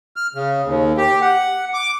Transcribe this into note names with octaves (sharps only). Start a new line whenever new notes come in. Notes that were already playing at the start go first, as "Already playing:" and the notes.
F6
C#3
D#2
G4
F#5
D6